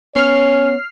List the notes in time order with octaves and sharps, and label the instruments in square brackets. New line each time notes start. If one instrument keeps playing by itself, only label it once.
[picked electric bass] B3 [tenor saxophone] C#4 [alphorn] C#5 [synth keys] F6 C7